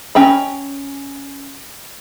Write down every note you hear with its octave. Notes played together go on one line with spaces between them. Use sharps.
C#4 G5 A#5 B5